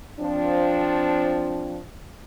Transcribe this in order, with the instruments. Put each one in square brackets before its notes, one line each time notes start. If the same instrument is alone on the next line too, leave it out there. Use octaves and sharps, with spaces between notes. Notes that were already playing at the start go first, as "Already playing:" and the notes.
[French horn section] F3 C4 D4